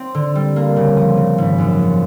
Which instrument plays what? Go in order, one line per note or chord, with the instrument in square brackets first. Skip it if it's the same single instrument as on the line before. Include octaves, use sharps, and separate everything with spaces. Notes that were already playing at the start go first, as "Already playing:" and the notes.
Already playing: [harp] C4
D3
G3
A#3
C#3
F3
C#3
G#1
F#2
F3